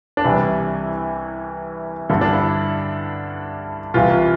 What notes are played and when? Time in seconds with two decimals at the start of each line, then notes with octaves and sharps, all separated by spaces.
0.17 D4
0.24 C2 C3 E3 G3 E4
2.09 G2 D3 G3 E4
2.21 D4
2.33 E4
3.94 C2 C3 E3 F4